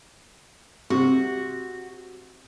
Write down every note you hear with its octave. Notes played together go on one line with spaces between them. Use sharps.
C3 F#4 G4